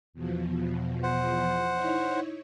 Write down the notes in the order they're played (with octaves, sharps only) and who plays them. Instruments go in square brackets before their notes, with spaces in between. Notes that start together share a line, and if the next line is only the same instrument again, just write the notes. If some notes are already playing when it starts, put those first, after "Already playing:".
[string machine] E2 B2 F3
[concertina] C5 F#5
[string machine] D#4 E4 C#5